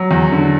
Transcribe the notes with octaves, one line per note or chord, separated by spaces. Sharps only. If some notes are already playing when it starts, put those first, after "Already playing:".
Already playing: F#3
E2
D3